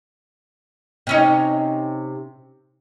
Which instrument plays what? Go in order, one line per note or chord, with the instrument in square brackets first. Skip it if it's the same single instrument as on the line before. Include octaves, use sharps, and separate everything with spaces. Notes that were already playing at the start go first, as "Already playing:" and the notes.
[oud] C3 C#4 D#4